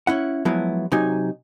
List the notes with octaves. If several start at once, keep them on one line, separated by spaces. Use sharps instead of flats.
C#4 E4 F#5
F3 F#3 G#3 B3 E4
C3 F#3 D#4 G#5